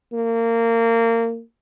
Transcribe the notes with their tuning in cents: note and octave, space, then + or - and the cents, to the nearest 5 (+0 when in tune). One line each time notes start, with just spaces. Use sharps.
A#3 -25